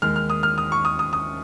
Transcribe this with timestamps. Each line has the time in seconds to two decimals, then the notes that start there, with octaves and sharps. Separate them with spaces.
0.02 D#2 D#3 G#3 F6
0.16 F6
0.30 D#6
0.43 F6
0.58 D#6
0.72 C#6
0.85 D#6
0.99 D#6
1.13 D#6